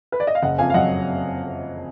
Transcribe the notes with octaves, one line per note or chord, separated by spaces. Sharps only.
B4
D5
D#5
F5
F#1 D#5 F#5
F2 F5 G#5
F5
F#3 D#5 F#5